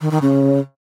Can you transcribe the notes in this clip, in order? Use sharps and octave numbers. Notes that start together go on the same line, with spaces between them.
D#3
D#3
C#3